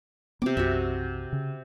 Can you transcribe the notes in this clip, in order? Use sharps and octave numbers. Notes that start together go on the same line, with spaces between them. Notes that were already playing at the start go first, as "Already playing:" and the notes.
C3 B3 C4 D6
B1 F#2 F#4 E5
C#3